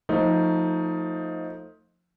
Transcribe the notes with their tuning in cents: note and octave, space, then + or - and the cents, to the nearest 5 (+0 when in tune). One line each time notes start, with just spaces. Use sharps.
F3 +15 A3 +30 D#4 +15